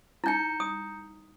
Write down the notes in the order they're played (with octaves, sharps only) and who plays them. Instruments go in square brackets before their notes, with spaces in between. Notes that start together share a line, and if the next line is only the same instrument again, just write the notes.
[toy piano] D#4 E4 [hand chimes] A#5 G6 C#7
[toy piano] D#6